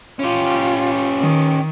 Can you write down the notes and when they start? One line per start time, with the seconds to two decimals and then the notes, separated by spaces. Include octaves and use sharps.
0.19 C#4 F4 G4
1.21 D#3